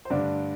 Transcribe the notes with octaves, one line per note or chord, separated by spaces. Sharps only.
C5
G2 D3 A3 D4 D5